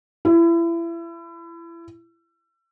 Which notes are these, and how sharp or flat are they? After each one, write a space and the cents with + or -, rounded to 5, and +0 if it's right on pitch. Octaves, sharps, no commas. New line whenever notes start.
E4 +30